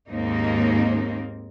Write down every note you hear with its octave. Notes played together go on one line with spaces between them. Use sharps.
D#2 G#2 A#3 C4 D#4